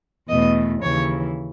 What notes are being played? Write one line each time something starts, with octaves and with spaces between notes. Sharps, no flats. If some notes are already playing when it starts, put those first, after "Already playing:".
E2 B2 A3 D#5
D#2 C#3 E3 C#5